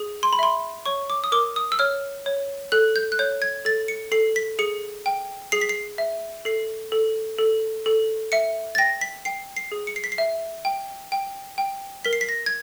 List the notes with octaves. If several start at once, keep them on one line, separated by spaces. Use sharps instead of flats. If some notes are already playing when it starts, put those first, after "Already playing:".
Already playing: G#4
C6
B5
E5 C6
C#5 C#6
D6
D#6
A#4 D6
D#6
E6
C#5 F6
C#5
A4 F#6
G6
F#6
C#5 G6
G#6
A4 A6
C#7
A4 C7
B6
G#4 C#7
G5
G#4 C7
B6
C7
E5
A4 C7
A4
A4
A4
E5 C#7
A6
G5 A#6
B6
G5 C7
C7
G#4
C#7
C7
B6
C7
E5
G5
G5
G5
A#4 B6
C7
B6
A#6
G#6